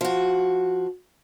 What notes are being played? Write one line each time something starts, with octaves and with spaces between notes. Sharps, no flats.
F3 F#4